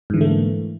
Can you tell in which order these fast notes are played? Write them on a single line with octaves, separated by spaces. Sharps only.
G#2 E3 D3 A3 A#3